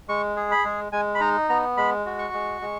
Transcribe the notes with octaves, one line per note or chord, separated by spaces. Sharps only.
G#3 C#6
G#4
B5
G#3
G#3 G#5
B5
D#4 A#5
B3 A#5
G#3 B5
F#4
C#6
G#3
G#3